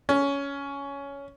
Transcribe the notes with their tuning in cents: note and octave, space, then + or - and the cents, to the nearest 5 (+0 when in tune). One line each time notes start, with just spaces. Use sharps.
C#4 +15